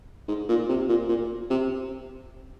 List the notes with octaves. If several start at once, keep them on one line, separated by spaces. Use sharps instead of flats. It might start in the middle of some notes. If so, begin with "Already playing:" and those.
G#2
A#2
C3
A#2
A#2
C3